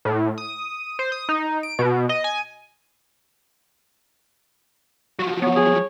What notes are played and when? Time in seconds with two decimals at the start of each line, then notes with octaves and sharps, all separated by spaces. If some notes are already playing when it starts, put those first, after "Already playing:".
0.05 A2
0.38 D#6
0.99 C5
1.12 D#6
1.29 D#4
1.63 D7
1.79 B2
2.09 D#5
2.24 G#5
5.19 F3 F#3 F#4
5.42 B3 C#5
5.56 G#4